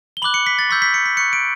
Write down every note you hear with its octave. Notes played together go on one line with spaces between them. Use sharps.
G7
B5 D6 F#6 F#7
C#7
B6
A6
C#6 E6 G6 B6
B6
C#7
B6
C#6 F#6 C#7
D7